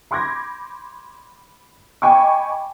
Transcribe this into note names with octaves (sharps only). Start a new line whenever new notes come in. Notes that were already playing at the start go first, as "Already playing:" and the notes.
B5 C6 D6 G6 G#6 A#6
D#5 G5 G#5 B5 C#6 D6